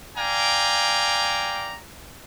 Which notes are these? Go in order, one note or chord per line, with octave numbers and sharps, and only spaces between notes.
D5 F5 G5 G#5 A#5